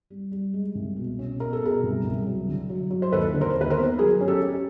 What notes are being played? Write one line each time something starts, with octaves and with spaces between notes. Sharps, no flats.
G3
G3
G#3
C2
B2
C#4
B2 A#4
A4
B2 G#4 A#4
C2
C2
F#3
D3
F#3
F#3
C5
D#2 A4 B4
D3
A#4 C5
D#2
B4
A#4 C5
B3
F#3 G#4 A#4
C#4
G4 A4
C#4